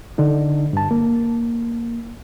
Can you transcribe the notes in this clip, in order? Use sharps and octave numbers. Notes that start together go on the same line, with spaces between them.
D3 D4 D#4
G2 A5
A#3